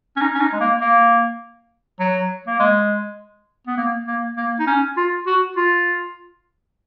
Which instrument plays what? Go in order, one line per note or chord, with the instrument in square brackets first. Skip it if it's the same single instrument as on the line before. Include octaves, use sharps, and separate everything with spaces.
[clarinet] C#4
D#4
C#4
D#4
G#3
A#3
A#3
F#3
A#3
G#3
B3
A#3
A#3
A#3
D#4
C#4
F4
F#4
F4